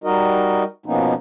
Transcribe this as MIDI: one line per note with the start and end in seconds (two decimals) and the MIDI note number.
0.04 0.63 55
0.04 0.63 63
0.04 0.63 66
0.04 0.63 70
0.04 0.63 75
0.86 1.14 47
0.86 1.14 53
0.86 1.14 58
0.86 1.14 59
0.86 1.14 61
0.86 1.14 63